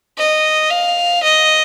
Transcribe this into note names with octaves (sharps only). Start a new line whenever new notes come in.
D#5
F5
D#5